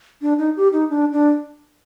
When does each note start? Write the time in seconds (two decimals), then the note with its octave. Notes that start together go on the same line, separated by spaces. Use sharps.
0.22 D4
0.39 D#4
0.57 G4
0.73 D#4
0.90 D4
1.13 D4